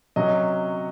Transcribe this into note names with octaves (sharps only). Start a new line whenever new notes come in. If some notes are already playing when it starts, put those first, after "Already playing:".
C3 F#3 C#4 D#5